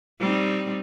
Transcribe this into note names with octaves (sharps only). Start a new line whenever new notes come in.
G3 C4 D#4